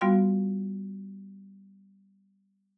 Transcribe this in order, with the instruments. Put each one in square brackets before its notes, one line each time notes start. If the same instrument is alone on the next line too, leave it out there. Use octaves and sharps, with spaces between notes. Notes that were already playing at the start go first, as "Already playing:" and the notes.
[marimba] G3 B3 F4 F#4 F5 C6